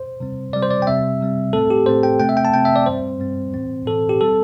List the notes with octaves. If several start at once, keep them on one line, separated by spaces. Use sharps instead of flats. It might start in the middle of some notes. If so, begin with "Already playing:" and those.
Already playing: C5
C3 G3 C4
C3 G3 C4 D5
C5
D5
G5
C3 G3 C4 E5
C3 G3 C4
A2 A3 C4 A4
G4
A2 A3 C4 C5
G5
C3 A3 C4 G5
E5
G5
A5
C3 A3 C4 G5
E5
D5
G2 G3 C4 C5
G2 G3 C4
A2 E3 C4
A2 E3 C4 A4
G4
G3 C4 A4